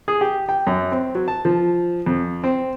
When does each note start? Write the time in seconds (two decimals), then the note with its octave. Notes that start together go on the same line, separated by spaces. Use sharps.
0.08 G#4
0.21 G4
0.49 G5
0.67 F#2
0.92 C4
1.15 F#3
1.28 A5
1.45 F3
2.06 F2
2.44 C4